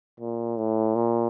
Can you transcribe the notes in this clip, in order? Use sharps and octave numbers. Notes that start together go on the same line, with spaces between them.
A#2
A2
A#2